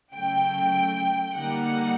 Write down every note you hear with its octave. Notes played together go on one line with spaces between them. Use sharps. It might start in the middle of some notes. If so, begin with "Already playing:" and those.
C#3 F#3 A3 G5
D3 G3 A#3 D#4 F#5